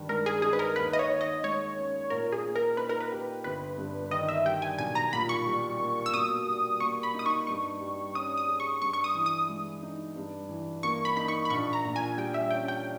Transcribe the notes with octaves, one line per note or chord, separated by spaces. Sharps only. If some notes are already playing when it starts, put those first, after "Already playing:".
Already playing: G2 D#3
G#3 A#4
G#4
D#4 G#4
B4
A#4
D#2 B4
D#5
C#5
D#3
D#5
G#3 C#5
C#4
A#2 A#4
G#4
A#3
A#4
D#4 B4
A#4
B4
G4
G1 B4
G2
D#3 D#5
E5
G3 G5
G#5
B1 G#5
A#5
A#2 B5
C#6
G3
A#3
E6
B2 D#6
G3
A#3 C#6
B5
D#4 D#6
C#6
G2 C#6
G3
C#4 D#6
D#6
G#4
C#6
G2 C#6
C#6
D#6
E3
D#6
G#3
D#4
G2
E3
A#3 C#6
B5
D#4 B5
C#6
B5
A#1 C#6
A#5
A#2
G#5
G3 G5
E5
C#4 G5
G5